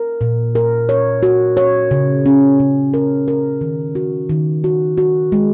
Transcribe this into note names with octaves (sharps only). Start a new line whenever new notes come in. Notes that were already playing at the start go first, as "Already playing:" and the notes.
Already playing: A#4
A#2
A#4
C#5
F#4
C#5
C#3
C#4
C#3
A#4
A#4
D#3
F#4
D#3
F#4
F#4
G#3